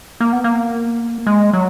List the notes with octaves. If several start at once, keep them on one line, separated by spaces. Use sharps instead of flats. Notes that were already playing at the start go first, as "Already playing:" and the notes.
A#3
B3
A#3
G#3
F#3